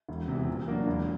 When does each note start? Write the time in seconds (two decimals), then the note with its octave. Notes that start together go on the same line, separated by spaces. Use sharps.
0.09 E1
0.28 E2 C3
0.47 A#2
0.68 F#3 A#3 D4
0.87 E1